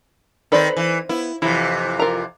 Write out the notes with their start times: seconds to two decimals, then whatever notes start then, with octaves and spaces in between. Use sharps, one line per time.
0.52 D#3 C4 A4 B4 D5
0.77 E3
1.09 B3 E4
1.42 F2 C3 E3 E4
1.99 F4 A#4 A#5